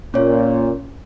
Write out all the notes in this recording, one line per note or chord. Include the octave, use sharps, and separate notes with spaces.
A#2 C#4 C#5